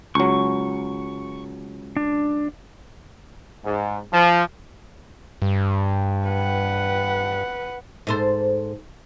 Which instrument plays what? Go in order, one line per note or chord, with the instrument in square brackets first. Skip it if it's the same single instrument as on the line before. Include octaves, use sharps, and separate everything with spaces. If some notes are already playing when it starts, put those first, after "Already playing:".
[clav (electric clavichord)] C#2 F#3 [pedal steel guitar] C#6
[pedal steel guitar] D4
[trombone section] G#2
F3
[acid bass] G2
[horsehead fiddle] B4 F#5
[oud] G#2 A4 C5